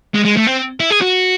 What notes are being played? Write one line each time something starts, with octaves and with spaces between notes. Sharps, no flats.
G#3
G#3
A3
C4
E4
G#4
F#4